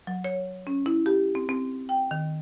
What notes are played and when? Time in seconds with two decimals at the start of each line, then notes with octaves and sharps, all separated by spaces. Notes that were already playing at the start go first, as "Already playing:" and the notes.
0.07 F#3
0.24 C#5
0.67 C#4
0.86 E4
1.06 G4
1.35 C4
1.49 C4
1.89 G5
2.11 D#3